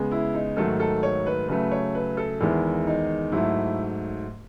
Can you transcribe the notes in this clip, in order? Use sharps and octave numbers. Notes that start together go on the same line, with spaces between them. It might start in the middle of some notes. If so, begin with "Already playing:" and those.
Already playing: C#3 G#3 B3
E4
D#4
G#2 D#3 F#3 A3 A4
A4
C#5
B4
C#3 F#3 A3 B4
C#5
B4
A4
E2 D#3 G#3 B3 E4
D#4
G#2 F#3 A3 E4